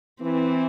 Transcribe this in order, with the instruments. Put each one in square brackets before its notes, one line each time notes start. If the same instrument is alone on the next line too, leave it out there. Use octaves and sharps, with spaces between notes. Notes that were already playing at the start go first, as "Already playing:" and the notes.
[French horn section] E3 [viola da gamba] C4